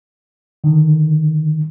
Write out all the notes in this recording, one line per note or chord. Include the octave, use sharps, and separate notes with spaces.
D3 D#3